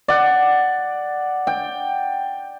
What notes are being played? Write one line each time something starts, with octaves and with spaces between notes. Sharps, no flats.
D5 F#5
G5